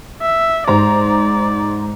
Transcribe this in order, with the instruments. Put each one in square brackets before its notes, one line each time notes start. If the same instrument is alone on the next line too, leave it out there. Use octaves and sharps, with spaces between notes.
[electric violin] E5
[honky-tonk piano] G#2 C5 A#5 [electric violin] D5